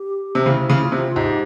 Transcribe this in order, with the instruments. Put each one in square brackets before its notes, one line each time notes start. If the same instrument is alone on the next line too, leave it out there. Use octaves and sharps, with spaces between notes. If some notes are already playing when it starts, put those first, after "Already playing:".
Already playing: [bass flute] G4
[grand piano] C3
[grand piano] C#3 [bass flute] E4
[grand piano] C#3
[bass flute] F4
[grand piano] C3
[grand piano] G#2 [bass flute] G4